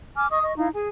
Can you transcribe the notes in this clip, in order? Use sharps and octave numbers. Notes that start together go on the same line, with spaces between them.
G#5 D6 F6
D#5 C#6 D#6
D#5 C#6
D#4 E4 F5
G#4 G#5